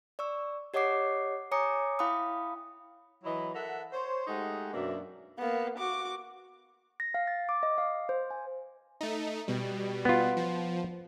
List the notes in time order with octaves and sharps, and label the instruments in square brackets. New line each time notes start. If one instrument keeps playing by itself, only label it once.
[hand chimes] D5 C#6 E6
G4 C#5 D#5 F#5 D6 C7
C#5 G#5 A#5 D6 D#6 C#7
E4 F5 G5 B5 D#6
[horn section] E3 F#3 E4 D#5 B5
A4 A#4 E5 F#5
C5 C#5
G#3 A3 D#4 G4 D#5 F#5
F#2 B2 A#3 D4 E5
[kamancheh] A#3 B3
F#4 D6
[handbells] A#6
F5
A6
D6
D#5
F5
C5
G#5
[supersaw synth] A3 D#4
B2 G3
[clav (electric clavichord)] B3 F4
[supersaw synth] F3